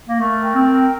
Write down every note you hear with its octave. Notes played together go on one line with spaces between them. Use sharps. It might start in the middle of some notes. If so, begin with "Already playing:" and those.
A#3
A3 A#4
G5
C4
A#4